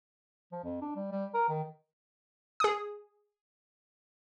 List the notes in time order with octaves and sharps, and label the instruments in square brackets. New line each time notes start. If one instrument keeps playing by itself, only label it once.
[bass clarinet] F3
F2
D4
G3
G3
A#4
D#3
[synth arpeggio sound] G#4 D#6